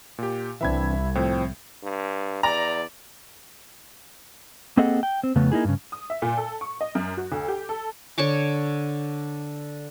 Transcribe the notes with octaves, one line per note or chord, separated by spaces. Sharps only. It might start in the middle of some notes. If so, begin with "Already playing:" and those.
A#2 G4
C2 E3 C4 D4 E5 B5 G#6
A2 F3 C4
G2
E2 D5 A#5
A#3 C4 G#4 A4 D#5 F#5
G5
C4
F2 C#3 A3 B3
A#3 D#4 E4 G#4
G2 C#3
D#6
E5
A#2
A4
C#6
D#5
F#2
F#4
D2
G4
A4
D3 C#5 C#6 D6